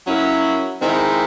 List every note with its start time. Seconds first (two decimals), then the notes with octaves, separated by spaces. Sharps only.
0.07 F#3 A#3 C#4 E4
0.80 D#3 G#3 C4 E4